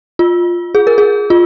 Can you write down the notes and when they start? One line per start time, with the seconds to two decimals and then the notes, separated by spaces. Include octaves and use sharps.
0.19 F4
0.75 G#4
0.87 A#4
0.98 G#4
1.30 F4